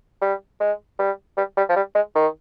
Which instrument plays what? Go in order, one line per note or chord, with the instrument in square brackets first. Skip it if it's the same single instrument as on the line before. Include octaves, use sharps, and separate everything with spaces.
[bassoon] G3
G#3
G3
G3
G3
F3
G3
G#3
D#3